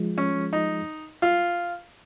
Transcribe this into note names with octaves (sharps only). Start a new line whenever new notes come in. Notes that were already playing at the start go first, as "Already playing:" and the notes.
Already playing: F3 G#3 F4 G#4
C#4
D#4
F4